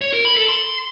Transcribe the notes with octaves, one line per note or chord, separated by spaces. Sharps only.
C#5
A#4
B5
A4
C6